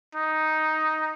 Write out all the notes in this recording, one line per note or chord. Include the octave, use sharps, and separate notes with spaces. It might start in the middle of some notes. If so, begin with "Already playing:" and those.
D#4